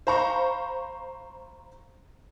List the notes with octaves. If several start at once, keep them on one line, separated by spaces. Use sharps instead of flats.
C5 F5 A#5 B5 C#6